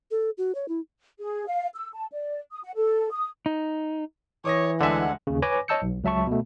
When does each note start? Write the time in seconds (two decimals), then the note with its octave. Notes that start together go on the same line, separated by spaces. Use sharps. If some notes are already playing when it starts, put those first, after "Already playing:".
0.11 A4
0.38 F#4
0.55 C#5
0.68 E4
1.19 G#4
1.47 F5
1.75 E6
1.93 A5
2.12 D5
2.52 D#6
2.64 F#5
2.76 A4
3.12 D#6
3.46 D#4
4.45 E3 C#5 D6 D#6 A#6
4.81 D2 D3 G#3 E5 F#5 G#5
5.27 D#2 C#3
5.42 B4 C#5 G#5 D6 A#6
5.68 C#5 D#5 A5 E6 G6 C#7
5.82 B1
6.04 C#2 F#3 E5 A5 C#6
6.27 B2 A3